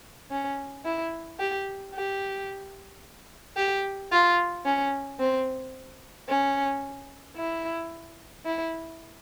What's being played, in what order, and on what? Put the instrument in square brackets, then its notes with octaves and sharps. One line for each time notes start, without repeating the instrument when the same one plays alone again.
[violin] C#4
E4
G4
G4
G4
F4
C#4
C4
C#4
E4
E4